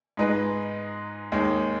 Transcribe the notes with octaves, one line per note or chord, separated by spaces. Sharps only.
G#2 G#3 D#4 B4
D#2 D#3 G#3